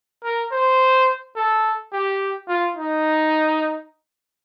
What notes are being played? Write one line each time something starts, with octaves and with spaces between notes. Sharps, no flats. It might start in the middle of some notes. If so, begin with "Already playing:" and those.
A#4
C5
A4
G4
F4
D#4